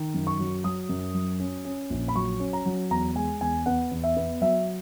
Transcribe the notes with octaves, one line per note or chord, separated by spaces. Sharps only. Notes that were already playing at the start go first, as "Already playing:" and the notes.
Already playing: D#3
F#2
C#6
F#3
F#3 D#6
F#2
F#3
C#4
C#4
A#1
B5
F#3 C#6
C#4
A#5
F#3
E2 A#5
G#3 G#5
E2 G#5
B3 F#5
E2
E5
B3
F#3 E5